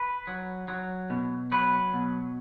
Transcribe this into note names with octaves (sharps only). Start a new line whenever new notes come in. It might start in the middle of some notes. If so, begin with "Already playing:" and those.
Already playing: B4
F#3
F#3
B2
F#3 B4
B2